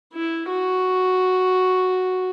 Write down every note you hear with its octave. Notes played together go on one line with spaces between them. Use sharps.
E4
F#4